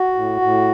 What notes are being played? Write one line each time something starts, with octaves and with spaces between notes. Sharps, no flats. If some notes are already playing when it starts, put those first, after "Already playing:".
Already playing: F#4
A2
A2